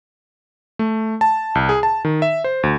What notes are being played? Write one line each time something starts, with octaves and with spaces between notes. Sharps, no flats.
A3
A5
C2
G#4
A5
D#3
E5
C5
D2